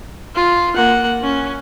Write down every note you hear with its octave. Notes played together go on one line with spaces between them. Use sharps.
F4
A#3 F#5
C#4